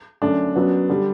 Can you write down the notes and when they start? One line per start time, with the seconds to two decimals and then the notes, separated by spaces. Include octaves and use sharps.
0.22 F#2 D3 A3 D4
0.56 F#2 F#3 B3
0.89 D3 G3